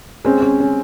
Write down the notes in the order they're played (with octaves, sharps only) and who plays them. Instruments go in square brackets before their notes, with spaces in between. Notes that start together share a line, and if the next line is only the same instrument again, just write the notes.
[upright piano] G#3 C4 [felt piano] C#4
[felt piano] C#4
C#4